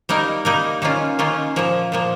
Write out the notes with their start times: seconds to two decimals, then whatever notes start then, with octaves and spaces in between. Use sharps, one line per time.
0.09 G3 A#3 D#4 A#4
0.45 G3 A#3 D#4 A#4
0.82 D#3 A#3 C#4 F4
1.19 D#3 A#3 C#4 F4
1.56 A#2 F3 A#3
1.92 A#2 F3 A#3